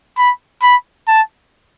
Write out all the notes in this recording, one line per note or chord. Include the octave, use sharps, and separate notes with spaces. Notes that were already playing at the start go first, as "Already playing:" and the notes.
B5
B5
A5